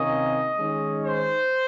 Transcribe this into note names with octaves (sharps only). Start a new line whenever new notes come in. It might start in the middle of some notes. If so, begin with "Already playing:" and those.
Already playing: C3 D#3 A#3 C#4 D#5
D#3 G#3 C#4
C5